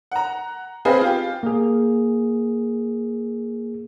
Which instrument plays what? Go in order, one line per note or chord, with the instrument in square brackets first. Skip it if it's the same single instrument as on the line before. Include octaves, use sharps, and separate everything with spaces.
[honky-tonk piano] F#5 A#5
B3 C4 G#4 B4 D#5 F5
F4 G4
[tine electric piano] A#3 G#4